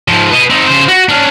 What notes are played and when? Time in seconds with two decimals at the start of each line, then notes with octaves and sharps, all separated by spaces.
0.08 G#2 F3
0.31 B4 D#5
0.50 C4 D#4
0.67 C#3 C5
0.89 F#4
1.09 C#4 D4